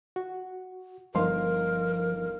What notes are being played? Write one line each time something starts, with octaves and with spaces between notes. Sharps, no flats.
F#4
G1 F3 D#4 A#4 F5 C6